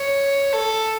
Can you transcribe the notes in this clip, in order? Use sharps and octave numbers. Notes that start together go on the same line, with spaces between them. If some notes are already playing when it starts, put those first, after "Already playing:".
Already playing: C#5
A4